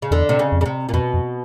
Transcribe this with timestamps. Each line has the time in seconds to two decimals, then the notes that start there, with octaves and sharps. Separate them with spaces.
0.02 C#3
0.11 E2 D3
0.29 C3
0.39 C#3
0.52 F2
0.61 C#3
0.66 C3
0.89 A#2
0.93 F2 B2
1.14 F2